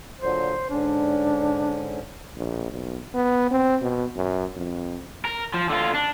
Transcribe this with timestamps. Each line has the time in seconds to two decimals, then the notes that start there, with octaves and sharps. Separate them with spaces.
0.21 A#2 D3 F#3 C5
0.70 G#2 D3 C#4 D4
2.37 A#1
2.72 B1
3.14 B3
3.51 C4
3.82 B2
4.16 F#2
4.57 F2
5.25 A#4
5.54 F3
5.70 D3 F4
5.94 D4